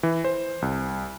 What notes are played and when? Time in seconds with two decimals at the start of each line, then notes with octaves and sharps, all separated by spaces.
0.03 E3
0.24 C5
0.62 C2